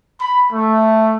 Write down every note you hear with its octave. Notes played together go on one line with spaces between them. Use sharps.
B5
A3